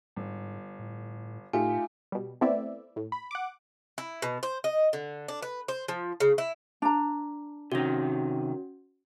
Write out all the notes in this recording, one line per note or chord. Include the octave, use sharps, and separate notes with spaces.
G1 G#2
A2
A2 A3 D#4 F4 G4 F5 G#5
B2 G3
A3 B3 C4 E4 D5 E5
A2
B5
F#5 D6
E4
B2
C5
D#5
D3
D4
B4
C5
F3
C#3
E4
D4 A#5
C3 D#3 C#4 F#4